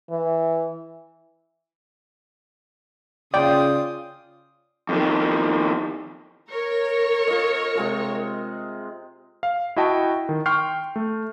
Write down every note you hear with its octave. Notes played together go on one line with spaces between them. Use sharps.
E3
C#3 F4 D5 G5 D#6
F2 D#3
A#4 C#5
F4 D#5
C3 G#3 F4
F5
E4 F#4 D#5 G5 A5
D#3
G5 C6 C#6 F6 G6 C7
A3